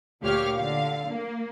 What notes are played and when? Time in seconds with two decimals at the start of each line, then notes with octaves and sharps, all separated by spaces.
0.22 D2 A#2 G4 C#5 F5 F6
0.56 D3 F5
1.09 A#3